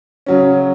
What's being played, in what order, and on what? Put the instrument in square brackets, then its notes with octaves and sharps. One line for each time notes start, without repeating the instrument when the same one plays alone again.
[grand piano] C#3 F#3 C#4